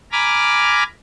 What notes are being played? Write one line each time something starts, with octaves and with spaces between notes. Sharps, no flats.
G#5 A#5 B5 D6 F6